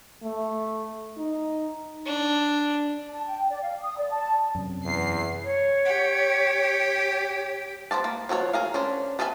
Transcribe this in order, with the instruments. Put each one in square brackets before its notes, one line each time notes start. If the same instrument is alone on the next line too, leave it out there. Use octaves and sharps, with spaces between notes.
[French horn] A3
D#4
[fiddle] D4
[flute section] A5
G5
D5
F5
D#6
D5
A5
[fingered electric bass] F#2 C3
[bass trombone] E2 [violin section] C7
[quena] C#5
[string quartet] G4
[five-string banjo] B3 C5 D5 A5
A#3
F3 F#4 A4 C#5
G#4 A#4 F5
C#4 D4 C5
B3 A4 B4 E5 G#5